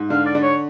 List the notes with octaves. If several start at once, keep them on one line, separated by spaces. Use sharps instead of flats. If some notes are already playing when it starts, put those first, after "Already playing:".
Already playing: G#2
D3 F5
D5
D3
C#5